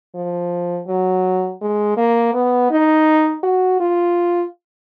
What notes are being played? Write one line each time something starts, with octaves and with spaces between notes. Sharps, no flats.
F3
F#3
G#3
A#3
B3
D#4
F#4
F4